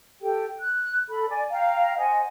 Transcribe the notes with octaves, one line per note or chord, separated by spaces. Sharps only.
G4 A4 G5
F#6
A4 B5
D5 G#5
F5 G5 A#5
C5 D#5 F#5 G#5